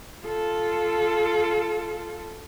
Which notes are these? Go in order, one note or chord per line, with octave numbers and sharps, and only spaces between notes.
F4 A4